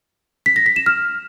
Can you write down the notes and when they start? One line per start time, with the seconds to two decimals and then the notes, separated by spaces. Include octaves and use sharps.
0.46 B6
0.56 A#6
0.66 B6
0.76 E7
0.86 F6